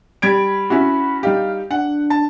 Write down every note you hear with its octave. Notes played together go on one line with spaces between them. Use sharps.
G3 B5 G#6 D7
C#4 E4 F#4
G3 D#4 G4 F5
D4 F#5
A5